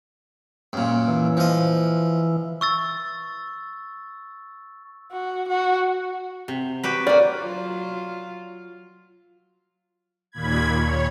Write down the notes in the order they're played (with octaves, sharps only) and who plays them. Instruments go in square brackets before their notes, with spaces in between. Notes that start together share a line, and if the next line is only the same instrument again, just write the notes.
[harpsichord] F#2 A#2
[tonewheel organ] E3
[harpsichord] F3 D#5
[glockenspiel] C#6 E6 A6
[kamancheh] F#4
F#4
[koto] C3
F#4 G4 B4
[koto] A#3 F#4 [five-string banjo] D5
[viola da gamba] F#3 F4
[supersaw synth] D#2 A#2 B5 G#6
C#5